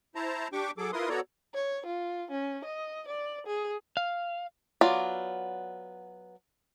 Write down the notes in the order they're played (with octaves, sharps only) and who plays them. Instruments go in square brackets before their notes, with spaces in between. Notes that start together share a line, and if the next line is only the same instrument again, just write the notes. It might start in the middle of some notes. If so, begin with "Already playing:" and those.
[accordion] E4 C5 A5 A#5
D4 G4 G5 C#6 D6
F#3 G#4 A4 D6
E4 F4 A#4 B4 C6 D#6
B3 F#4 A4 C#5 D5 A#5
[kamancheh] C#5
F4
C#4
D#5
D5
G#4
[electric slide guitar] F5
[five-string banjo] F#3 B3 F4 D5